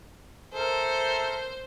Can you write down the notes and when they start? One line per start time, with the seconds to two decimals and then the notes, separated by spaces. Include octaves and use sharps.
0.54 A4 A#4 C5 E5